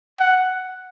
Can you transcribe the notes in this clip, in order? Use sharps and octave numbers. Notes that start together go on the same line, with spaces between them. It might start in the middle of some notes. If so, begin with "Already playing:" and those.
F#5